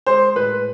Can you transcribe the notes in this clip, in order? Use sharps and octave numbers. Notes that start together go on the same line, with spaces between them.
G#3 C5
A2 B4